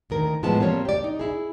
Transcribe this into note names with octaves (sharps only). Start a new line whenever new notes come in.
D2 D#3 A#4
A2 F3 G#3 B3 A5
F3 G3 A#3 C4 C#5
G4 D5
D#4
E4 G#4